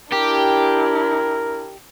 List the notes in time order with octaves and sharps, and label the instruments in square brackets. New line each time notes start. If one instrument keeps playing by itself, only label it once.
[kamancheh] D4 E4 [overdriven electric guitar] G4 [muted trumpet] A#4